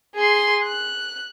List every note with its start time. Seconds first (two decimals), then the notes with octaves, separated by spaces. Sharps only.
0.15 G#4 C6
0.64 F#6